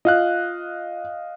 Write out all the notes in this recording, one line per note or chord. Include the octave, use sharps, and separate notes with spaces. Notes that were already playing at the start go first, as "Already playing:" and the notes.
F4 D#5 F5 F#6